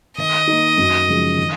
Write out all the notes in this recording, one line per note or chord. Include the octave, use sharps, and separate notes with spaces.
D#3 D#5
A#3 D#4
F#2
C#3 F3 G#3
D#3